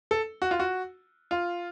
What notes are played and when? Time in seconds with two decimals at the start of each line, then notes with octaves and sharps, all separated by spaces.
0.11 A4
0.42 F#4
0.51 F4
0.59 F#4
1.31 F4